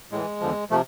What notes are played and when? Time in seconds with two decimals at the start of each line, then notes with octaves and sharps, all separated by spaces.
0.12 A2 E3 G#3
0.40 E2 D3 F3
0.70 C3 F3 A3